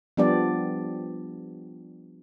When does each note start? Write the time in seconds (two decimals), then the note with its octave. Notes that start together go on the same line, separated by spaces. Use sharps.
0.17 F3 G3 B3 D4 G4 D5